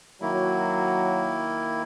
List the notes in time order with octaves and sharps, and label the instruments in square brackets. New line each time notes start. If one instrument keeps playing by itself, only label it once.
[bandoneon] D#3 A#3 E4 [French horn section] F#3